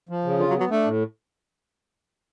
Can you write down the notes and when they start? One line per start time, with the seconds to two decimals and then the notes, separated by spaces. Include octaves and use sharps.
0.09 F3
0.24 C#3
0.39 D3 F4
0.50 F#3
0.55 B3
0.60 F#3
0.70 A3 D4
0.86 A2